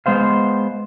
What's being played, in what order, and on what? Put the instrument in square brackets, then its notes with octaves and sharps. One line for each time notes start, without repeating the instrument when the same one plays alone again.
[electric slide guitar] G#3 B3 C5 F5